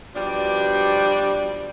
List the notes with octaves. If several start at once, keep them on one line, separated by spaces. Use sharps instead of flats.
B2 F3 G3 D4